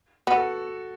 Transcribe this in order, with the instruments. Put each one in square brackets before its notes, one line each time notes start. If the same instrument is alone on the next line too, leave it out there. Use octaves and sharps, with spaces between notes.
[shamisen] B3 [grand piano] F#4
[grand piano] A4